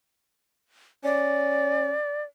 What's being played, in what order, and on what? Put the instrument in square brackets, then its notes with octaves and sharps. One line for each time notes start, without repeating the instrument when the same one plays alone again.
[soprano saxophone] C#4 [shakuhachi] D5